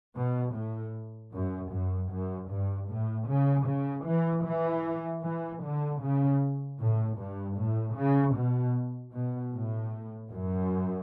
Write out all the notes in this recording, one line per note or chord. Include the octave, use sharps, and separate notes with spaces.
B2
A2
F#2
F#2
F#2
G2
A2
C#3
C#3
E3
E3
E3
D3
C#3
A2
G2
A2
C#3
B2
B2
A2
F#2